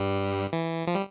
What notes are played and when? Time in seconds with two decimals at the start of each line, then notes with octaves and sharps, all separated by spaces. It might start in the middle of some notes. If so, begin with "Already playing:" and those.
Already playing: G2 G3
0.53 E3
0.87 F3
0.95 G3